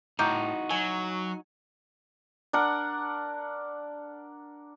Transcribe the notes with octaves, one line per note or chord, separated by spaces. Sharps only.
A2 D#4 F#4 A#5 D6 G6
F#3 G#5
D4 A#4 F#5